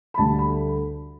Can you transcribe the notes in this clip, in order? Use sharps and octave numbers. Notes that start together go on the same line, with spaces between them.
B5
D2 D3 G3 A5
B5